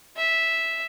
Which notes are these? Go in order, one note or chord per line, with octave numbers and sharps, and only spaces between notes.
E5